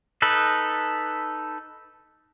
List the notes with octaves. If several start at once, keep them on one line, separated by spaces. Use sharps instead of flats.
D#4 A4 B4